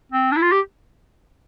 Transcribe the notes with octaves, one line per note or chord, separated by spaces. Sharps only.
C4
D4
E4
F4
G4